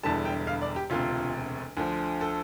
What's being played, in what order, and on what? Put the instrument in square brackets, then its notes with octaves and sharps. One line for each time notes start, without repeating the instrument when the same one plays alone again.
[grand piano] E1 E2 D3 G3 A5
G5
F5
D5
G4
E1 D2 C3 F4
D2 D3 F3
A4